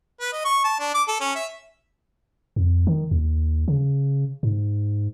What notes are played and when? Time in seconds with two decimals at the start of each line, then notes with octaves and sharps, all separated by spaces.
0.21 B4
0.33 D#5
0.45 C#6
0.64 A5
0.80 D4
0.94 D6
1.08 A4
1.21 C#4
1.35 E5
2.56 F2
2.87 D#3
3.11 D#2
3.68 C#3
4.43 G#2